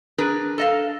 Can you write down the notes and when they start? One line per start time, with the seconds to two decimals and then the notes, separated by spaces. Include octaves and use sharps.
0.18 D4 G#4 A#4 B4
0.58 A4 D#5 F5